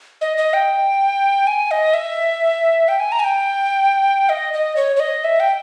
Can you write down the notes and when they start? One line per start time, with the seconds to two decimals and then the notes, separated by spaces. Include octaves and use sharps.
0.21 D#5
0.37 D#5
0.53 G5
1.47 G#5
1.71 D#5
1.94 E5
2.88 G5
3.00 G#5
3.12 A#5
3.19 G#5
3.24 G5
4.29 D#5
4.54 D#5
4.76 C#5
4.96 C#5
5.00 D#5
5.24 E5
5.40 G5